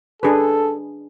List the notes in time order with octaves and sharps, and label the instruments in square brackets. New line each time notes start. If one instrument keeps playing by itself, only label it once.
[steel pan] D4 G#4 B4 [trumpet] A4